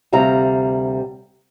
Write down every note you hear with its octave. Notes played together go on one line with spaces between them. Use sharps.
D2 C3 G3 F5 A#5